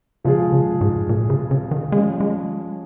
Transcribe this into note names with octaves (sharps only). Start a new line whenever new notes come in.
C#3 F3 G#3 F4 G#4
C#3
G#2
A#2
C#3
C#3
D#3
F3 G#3 C#4 G#4
G#3